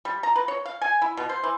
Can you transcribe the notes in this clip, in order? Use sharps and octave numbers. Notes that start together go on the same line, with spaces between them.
G3
A#5
B4
C#5
F5
G#5
E4
B2
C5
E3